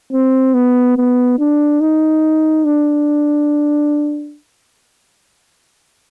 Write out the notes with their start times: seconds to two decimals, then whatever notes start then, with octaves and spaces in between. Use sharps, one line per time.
0.12 C4
0.54 B3
0.97 B3
1.39 D4
1.81 D#4
2.65 D4